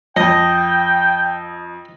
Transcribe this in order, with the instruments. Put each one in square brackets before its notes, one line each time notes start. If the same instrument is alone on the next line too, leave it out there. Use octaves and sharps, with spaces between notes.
[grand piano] F2 [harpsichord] D#5 [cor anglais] G5